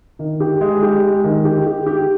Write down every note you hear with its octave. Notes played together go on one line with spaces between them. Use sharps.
D#3
G4
G#3
G4
G#3
D#3
G4
G4
G4